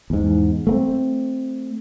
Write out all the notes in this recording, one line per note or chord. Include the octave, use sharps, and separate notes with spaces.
E2 G#2
A3 A#3 C4